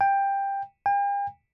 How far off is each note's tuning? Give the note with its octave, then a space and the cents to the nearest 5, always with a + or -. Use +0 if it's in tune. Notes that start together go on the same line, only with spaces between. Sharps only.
G5 +15
G5 +45